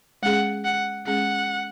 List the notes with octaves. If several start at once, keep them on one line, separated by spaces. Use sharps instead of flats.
G#3 C#4 G#4 F#5
F#5
G#3 C#4 G#4 F#5